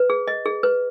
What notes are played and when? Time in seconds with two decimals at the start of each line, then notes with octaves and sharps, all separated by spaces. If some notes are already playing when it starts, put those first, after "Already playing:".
Already playing: B4
0.10 G#4
0.27 D#5
0.45 G#4
0.63 B4